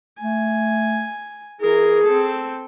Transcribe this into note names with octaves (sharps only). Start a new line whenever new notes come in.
A3 G#5
E3 G#4 A#4
C4 A4